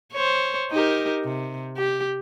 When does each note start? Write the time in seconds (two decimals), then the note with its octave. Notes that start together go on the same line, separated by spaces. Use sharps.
0.13 C5 C#5
0.71 D#4 G4 A#4
1.24 C3
1.77 G4